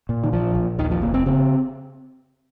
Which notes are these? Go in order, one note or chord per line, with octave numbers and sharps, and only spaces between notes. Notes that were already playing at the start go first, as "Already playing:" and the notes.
A#2
D#3
A#1 F3
A#1
D#2 D#3
F3
F1 A#3
C4
C#3 C4